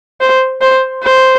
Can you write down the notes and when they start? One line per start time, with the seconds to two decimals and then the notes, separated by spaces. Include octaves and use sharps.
0.20 C5
0.62 C5
1.03 C5